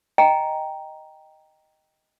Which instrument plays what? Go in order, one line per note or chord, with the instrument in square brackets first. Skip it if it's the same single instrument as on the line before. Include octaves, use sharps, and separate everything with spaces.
[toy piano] D#5 G5 G#5 A#5